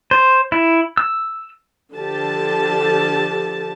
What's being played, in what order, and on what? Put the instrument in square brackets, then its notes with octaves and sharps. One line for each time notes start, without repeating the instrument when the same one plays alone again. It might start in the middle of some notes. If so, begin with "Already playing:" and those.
[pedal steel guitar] C5
E4
E6
[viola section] D3 F3 G4 A5